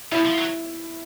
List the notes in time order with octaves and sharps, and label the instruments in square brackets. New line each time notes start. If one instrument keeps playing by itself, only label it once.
[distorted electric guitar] B2 [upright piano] E4
[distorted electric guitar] F3
F#3